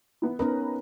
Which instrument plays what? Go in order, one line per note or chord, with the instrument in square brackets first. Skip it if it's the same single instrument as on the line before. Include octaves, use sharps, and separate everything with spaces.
[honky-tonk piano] B3 E4
[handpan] B3 C#4 A#4 [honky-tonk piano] D#4 B4 A#5